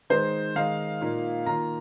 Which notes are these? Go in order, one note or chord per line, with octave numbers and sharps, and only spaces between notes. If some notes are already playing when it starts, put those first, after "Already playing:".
D#3 G#3 D#4 C5
D#3 G#3 D#4 F5
A#2 A#3 D#4
D#3 A#3 F4 A#5